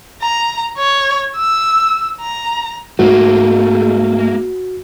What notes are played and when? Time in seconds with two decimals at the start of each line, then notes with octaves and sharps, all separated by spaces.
0.22 A#5
0.78 C#5
1.37 E6
2.21 A#5
2.99 G#2 A3 A#3 F#4